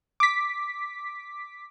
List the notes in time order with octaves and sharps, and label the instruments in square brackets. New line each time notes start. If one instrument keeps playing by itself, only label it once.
[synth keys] D6 B6